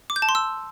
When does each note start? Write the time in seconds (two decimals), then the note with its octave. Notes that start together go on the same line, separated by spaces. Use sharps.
0.10 D6
0.16 G6
0.22 A5
0.29 C6
0.35 E6